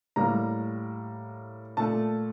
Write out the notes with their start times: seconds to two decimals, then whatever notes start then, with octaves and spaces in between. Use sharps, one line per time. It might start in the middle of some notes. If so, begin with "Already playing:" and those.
0.16 A2 G3 A#3 A#5
1.77 A#2 A3 A5